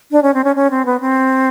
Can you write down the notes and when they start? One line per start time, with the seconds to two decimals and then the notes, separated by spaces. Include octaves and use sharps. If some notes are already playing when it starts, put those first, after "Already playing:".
0.11 D4
0.22 C#4
0.34 C4
0.44 C#4
0.56 C#4
0.70 C4
0.86 B3
1.00 C4